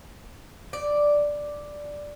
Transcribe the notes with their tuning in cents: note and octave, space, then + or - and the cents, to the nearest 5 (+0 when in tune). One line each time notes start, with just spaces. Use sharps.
D5 +0